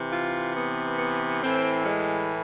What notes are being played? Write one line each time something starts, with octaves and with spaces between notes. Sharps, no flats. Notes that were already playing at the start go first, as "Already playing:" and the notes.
Already playing: C3 E3
F4
B3
B3
A2 E3 C4
G#3